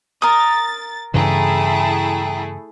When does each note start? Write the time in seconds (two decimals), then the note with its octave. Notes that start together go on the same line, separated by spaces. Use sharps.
0.22 A#4 D#6 A6
1.14 G2 C#3 E3 A3 E4 G#4 G5 A#5